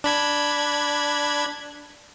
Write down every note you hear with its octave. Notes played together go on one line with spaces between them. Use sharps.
D4 B5 G#6